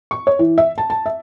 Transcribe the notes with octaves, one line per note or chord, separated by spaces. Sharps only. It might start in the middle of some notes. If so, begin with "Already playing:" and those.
C#6
C#5
E3
E5
A5
A5
E5